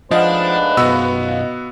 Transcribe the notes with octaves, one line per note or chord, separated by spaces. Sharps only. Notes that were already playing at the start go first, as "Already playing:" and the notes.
G#2 F3 A3 D4 B4 D#5 F5 F#5
B1 F#2 B3 F#4 E6